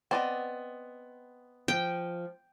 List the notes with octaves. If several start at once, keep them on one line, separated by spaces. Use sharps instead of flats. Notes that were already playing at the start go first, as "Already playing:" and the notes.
B3 C4 D5 D#5
F3 G5